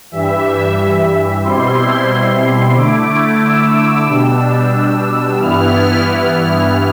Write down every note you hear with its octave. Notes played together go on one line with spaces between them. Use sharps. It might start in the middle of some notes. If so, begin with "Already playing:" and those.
G2 E3 G3 E5
B2 G3 C4 E4 C6
D3 A3 E4 D6
E6
B2 G3 D4
G2 E3 B3 E4 F6
F6